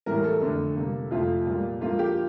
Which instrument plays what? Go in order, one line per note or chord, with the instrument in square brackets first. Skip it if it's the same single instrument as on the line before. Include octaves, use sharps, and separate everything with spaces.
[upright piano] A2 E3 G3 A#4
A4
F2 D3 A3
C3 G3 A#3
F2 C3 F3 A3 F4
A#2 G3 A#3
G2 F3 A#3 F4
G4